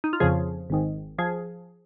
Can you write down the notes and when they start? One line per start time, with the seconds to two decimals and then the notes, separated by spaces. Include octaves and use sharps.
0.04 D#4
0.13 F4
0.20 F2 C#3 F3 G#4
0.70 G#1 G#2 D#3
1.18 F3 G#4